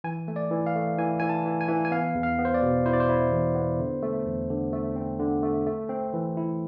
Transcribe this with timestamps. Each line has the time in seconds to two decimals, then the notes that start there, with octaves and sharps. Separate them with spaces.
0.04 E3 G#5
0.28 A3
0.36 D5
0.51 E3
0.66 F5
0.75 A3
0.98 E3 G#5
1.20 E3 G#5
1.29 A5
1.45 E3
1.61 G#5
1.68 E3
1.85 G#5
1.91 B3 F5
2.15 E2
2.23 F5
2.39 B3
2.45 C5
2.54 D5
2.62 B2
2.85 E4 C5
2.93 D5
3.00 C5
3.09 E4
3.32 E2
3.55 B3
3.80 D3
4.02 A3
4.26 E2
4.50 D3
4.73 A3
4.96 C4
5.19 D3
5.43 A3
5.67 A3
5.89 C4
6.13 E3
6.37 E4